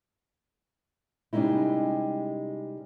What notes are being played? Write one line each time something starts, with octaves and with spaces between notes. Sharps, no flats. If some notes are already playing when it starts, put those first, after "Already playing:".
C3 G3 G#3 C#4 D#4 E4